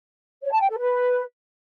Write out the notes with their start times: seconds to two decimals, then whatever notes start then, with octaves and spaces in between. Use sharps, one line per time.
0.43 C#5
0.52 A5
0.61 G5
0.69 A4
0.78 B4